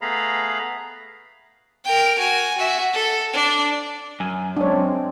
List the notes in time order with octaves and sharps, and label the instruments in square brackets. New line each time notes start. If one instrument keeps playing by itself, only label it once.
[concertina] A3 B3 G#4 F5 A#5 B5
[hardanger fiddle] A#4 G5
F#4 G#5
F#4 E5
A4
D4
[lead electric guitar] F#2 [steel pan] G#5
[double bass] G#3 C4 [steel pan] D4 C#5